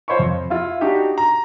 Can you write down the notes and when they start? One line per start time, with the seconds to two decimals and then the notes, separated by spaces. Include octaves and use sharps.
0.08 F4 C5 C#5 D#5 B5 C#6
0.19 F2
0.50 E4 F4
0.81 D4 D#4 F#4 G4
1.18 A#5